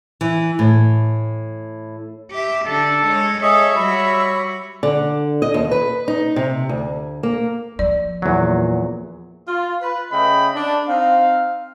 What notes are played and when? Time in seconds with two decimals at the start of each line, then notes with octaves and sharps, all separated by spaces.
0.21 E3
0.59 A2
2.31 G4 E5
2.66 D3 D4 A4
3.06 G#3 C#5
3.42 G#4 A4 C#5 D#5 E5
3.75 G3 F#4 C#5 B5
4.83 D3
5.42 D#5
5.54 D#2
5.71 B4
6.08 D#4
6.36 C3
6.69 D2
7.23 A#3
7.79 F3 D5
8.22 E2 A#2 F#3
9.46 F4
9.81 B4
10.11 C#3 A3 D#5 G5 B5
10.54 D4
10.88 C4 D#4 F5